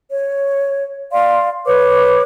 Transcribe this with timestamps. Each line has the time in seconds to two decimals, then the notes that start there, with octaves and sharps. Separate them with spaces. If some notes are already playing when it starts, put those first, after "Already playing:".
0.11 C#5
1.12 D5 F5 C6
1.66 B4 C#5 D6